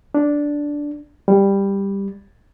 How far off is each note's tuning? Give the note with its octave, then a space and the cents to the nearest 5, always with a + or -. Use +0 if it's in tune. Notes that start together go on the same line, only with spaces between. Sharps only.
D4 -5
G3 +10